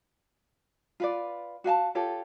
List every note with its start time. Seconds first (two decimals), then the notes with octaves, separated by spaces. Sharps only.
1.00 F4 B4 D5
1.64 F#4 F5 G#5 A5
1.95 F4 G4 A4 C#5